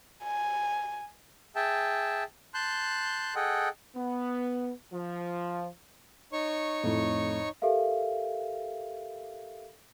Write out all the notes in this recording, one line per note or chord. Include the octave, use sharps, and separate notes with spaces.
G#5
G#4 E5 G5 A5
A5 C6 F#6 G6
G#4 A4 D#5 F#5 G5
B3
F3
D#4 C#5 C#6
F2 A2
G4 A4 A#4 E5 F5